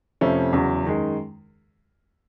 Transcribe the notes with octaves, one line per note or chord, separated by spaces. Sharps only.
F2 C3 F3 A3 C#4
E2 C#3 F#3
F#2 D#3 G#3